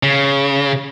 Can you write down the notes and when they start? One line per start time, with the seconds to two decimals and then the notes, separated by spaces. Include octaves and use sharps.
0.03 C#3